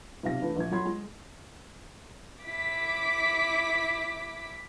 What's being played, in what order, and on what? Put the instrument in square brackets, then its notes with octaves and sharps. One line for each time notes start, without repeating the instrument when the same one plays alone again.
[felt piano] B1 C3 F5 A#6
E3 A3 D4 B4
A#1 G#6
F#3 A4 B5 C6 G#6
G#3
[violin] E4 D6 [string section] B6